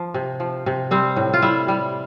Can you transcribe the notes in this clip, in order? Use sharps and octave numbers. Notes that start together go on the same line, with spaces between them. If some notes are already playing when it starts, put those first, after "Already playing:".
Already playing: F3
C3
F3
C3
G3 C4
A2
F4
G3 E4
G3